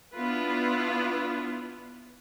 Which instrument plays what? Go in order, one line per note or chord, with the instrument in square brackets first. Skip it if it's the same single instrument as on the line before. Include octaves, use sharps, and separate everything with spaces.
[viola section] B3 D4 E4 F4 B4